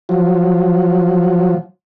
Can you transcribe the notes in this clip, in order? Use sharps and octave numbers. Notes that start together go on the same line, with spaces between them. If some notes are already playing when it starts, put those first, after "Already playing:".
F3 F#3